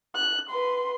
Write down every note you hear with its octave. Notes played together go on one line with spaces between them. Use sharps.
F#6
B4 C6